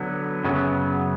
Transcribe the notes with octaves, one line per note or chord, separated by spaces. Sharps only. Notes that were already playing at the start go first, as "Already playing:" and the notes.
Already playing: D3 F#3 B3
F#2 C#3 F#3 B3